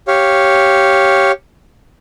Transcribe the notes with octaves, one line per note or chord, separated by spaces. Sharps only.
G4 C#5 F5